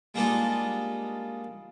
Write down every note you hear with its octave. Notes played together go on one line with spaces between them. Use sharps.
G3 G#3 A#3 D4 D#4 F4